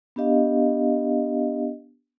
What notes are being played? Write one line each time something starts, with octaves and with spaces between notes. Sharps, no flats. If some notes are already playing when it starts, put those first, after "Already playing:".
B3 D4 G4 D#5 F5